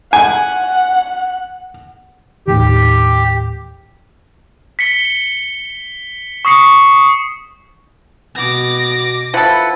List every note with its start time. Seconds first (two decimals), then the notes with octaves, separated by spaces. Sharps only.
0.13 F#5 G#5
2.48 D#2 A2 D#3 G4
4.79 B6 C#7 G7
6.45 C#6 D#6 C7 C#7
8.35 B2 B3 D6 A#6
9.34 F3 E4 A4 B4 F#5